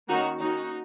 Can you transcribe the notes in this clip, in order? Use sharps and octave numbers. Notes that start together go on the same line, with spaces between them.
D#3 A#3 C#4 D#4 F#4
D#3 A#3 C#4 D#4 F#4